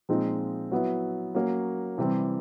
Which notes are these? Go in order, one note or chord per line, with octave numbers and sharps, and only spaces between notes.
A#2 F3 G#3 C4 D#4
F#3 B3 E4
F#3 A#3 C#4
C3 E3 G3 C4